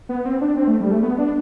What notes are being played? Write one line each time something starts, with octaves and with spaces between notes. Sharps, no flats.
B3
C4
D4
C4
A3
G3
A3
B3
D4